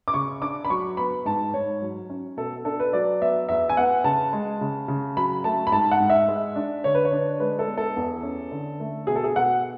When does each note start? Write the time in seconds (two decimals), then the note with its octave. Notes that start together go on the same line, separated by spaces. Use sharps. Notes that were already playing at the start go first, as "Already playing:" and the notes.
0.08 D6
0.14 C#3 C#6
0.42 D4 D6
0.65 B5
0.70 F#3 C#6
0.97 B3 B5
1.25 G#2 A5
1.54 G#2 C#5
1.81 F#3
2.10 C#4
2.37 B2 A4
2.65 D4 A4
2.80 B4
2.93 F#3 D5
3.21 B3 E5
3.49 E2 E5
3.69 G#5
3.77 B3 F#5
4.04 C#3 A5
4.33 G#3
4.61 C#3
4.88 C#3
5.16 F#3 B5
5.44 A3 A5
5.67 B5
5.72 G#2 A5
5.91 F#5
6.00 G#2
6.10 E5
6.28 G#3
6.56 D4
6.84 D3 C#5
6.95 B4
7.05 C#5
7.12 D4
7.40 G#3 B4
7.59 A4
7.68 B3
7.78 A4
7.96 E2
8.23 C#4
8.52 D3
8.80 A3
9.07 B2 G#4
9.16 A4
9.24 G#4
9.35 B2 F#5